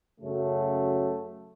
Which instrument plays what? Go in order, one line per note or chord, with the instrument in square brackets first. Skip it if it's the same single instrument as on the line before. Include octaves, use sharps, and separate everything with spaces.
[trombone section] F#2 C#3 F#3 A3